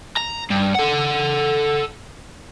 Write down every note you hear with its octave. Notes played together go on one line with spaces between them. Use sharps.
A#5
G2
A4 F#5